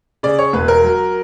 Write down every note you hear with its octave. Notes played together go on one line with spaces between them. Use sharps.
C#3 D5
C#5
E1 B4
A#4
F#3